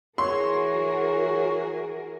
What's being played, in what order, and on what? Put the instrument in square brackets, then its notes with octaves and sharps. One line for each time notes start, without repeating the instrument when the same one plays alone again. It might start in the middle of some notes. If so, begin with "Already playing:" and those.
[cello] E3 A#4 [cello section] F#4 G#4 [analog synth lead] C#5 [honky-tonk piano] C6